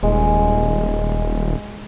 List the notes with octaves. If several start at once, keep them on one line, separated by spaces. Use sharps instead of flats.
D#1 G#3